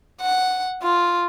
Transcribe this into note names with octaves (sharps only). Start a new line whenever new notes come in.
F#5
F4